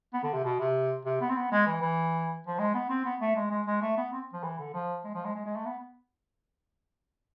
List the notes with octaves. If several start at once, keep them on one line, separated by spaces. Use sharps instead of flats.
B3
D3
C3
B2
C3
C3
B3
C4
B3
G#3
E3
E3
F3
G#3
B3
C4
B3
A3
G#3
G#3
G#3
A3
B3
C4
F3
E3
D3
F3
G#3
F3
G#3
G#3
G#3
A3
B3